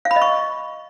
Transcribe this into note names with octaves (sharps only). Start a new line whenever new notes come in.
F5
B5
D#5
C#6